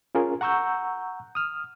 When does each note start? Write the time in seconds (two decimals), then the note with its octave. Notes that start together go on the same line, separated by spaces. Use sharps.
0.15 C#4 F4 G#4 A#4
0.41 F#5 A#5 C#6 E6 G6
1.35 D#6 F6